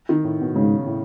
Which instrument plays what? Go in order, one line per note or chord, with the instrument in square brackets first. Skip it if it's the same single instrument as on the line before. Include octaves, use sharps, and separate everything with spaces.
[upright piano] D#3
A2
B2
[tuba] G#2 [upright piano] C#3
[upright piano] A2